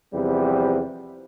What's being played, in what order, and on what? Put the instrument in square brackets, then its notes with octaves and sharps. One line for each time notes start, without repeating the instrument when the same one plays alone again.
[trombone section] E2 C3 F3 G3 C4